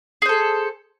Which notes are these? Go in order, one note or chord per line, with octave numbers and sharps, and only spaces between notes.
G#4 A4 C5